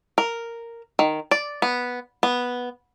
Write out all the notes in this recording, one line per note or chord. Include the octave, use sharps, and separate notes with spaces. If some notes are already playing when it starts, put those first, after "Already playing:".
A#4
D#3
D5
B3
B3